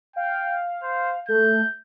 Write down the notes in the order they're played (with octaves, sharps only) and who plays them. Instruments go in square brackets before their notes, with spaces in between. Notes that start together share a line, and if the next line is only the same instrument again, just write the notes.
[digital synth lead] F5 [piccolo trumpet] G5
[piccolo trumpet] C5
[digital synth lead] A3 [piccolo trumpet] G6